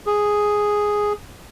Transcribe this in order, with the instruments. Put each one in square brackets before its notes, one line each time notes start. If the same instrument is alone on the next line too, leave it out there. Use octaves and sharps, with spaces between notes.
[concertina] G#4